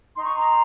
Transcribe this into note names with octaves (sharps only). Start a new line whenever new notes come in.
D#4 C6
C#6
A#5 C6